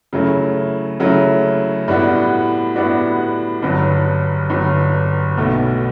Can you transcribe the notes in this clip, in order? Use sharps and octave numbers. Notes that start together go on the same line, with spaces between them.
C#3 F#3 A3 E4
C#3 F#3 A3 E4
A2 G3 B3 D4 F#4
A2 G3 B3 D4 F#4
G1 G2 F#3
G1 G2 F#3
B1 B2 A3